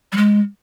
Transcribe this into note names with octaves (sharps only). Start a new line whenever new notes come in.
G3
G#3